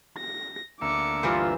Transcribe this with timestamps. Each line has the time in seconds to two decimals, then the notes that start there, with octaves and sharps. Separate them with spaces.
0.18 A#6
0.82 D2 A#3 E5 D6 C#7
1.23 G2 E3 F4 C5